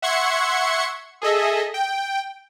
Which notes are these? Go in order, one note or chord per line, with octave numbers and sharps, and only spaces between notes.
E5 F#5 C6 C#6 G#6 C#7
G#4 A4 D#5 E5
G5